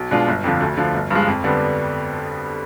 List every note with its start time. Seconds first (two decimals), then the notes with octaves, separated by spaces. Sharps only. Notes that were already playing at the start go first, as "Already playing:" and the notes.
Already playing: B1
0.11 B2 G#3 D4 F4
0.28 G1
0.44 F2 D3 F3
0.60 D2
0.77 D3 F3
0.94 G1
1.11 G2 F3 G#3
1.28 F2
1.44 D3 G3 B3 D4